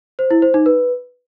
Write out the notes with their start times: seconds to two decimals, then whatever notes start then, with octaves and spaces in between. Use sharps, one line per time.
0.19 C5
0.31 E4
0.42 C5
0.54 D#4
0.66 B4